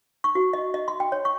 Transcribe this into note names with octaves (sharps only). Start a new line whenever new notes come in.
C#6
F#4
D#5
D#5
C6
G5
C#5
C#6